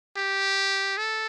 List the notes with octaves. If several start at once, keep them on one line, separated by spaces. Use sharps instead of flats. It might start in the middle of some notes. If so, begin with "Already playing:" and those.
G4
A4